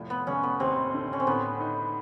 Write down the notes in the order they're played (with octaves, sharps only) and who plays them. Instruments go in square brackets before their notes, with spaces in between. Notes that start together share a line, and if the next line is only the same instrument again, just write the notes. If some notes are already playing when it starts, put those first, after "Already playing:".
Already playing: [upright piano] F1 A2 F3
[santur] B3
[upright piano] F1 [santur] C#4
[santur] B3
[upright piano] D#2 [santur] C4
[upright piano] D3
[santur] C#4
C4
[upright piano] A2 [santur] B3
[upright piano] D#4